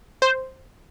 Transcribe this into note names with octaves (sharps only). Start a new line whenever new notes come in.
C5